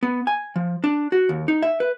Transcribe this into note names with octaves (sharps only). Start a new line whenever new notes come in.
B3
G#5
F3
D4
F#4
D#2
D#4
E5
B4